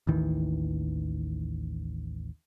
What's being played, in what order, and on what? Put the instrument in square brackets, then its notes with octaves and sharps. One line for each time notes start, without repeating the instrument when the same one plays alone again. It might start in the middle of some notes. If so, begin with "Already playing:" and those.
[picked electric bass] A1 D#2 D#3 E3